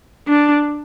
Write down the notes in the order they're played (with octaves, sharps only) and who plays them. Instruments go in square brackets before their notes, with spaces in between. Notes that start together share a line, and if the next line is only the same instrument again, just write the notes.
[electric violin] D4